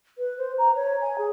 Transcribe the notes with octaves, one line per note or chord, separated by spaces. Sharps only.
B4
C5
A#5
C#5
G#5
G#4